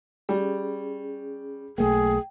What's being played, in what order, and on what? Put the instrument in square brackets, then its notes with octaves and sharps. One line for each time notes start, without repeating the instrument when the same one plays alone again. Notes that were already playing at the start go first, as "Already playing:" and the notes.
[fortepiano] G3 [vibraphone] C#4 G#4
[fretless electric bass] B1 A3 A#3 [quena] G#4 [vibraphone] G5